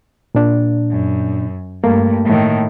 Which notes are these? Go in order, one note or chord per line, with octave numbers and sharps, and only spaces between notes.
A#2 D4
F#2
G2 A3 A#3
A2 D#3